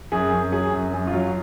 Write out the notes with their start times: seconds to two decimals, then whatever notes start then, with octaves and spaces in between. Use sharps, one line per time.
0.12 F#2 G#4
0.33 F#2
0.52 F#3 G#4
0.73 F#2
0.94 F#2
1.07 F4
1.13 F#3